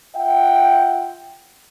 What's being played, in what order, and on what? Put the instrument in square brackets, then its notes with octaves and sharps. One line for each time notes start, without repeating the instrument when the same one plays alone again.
[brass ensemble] F4 E5 F#5 G5